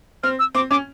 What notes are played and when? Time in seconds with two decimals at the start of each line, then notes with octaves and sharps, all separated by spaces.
0.23 C4 F6
0.39 E6
0.55 C4 D6
0.71 C#4 D6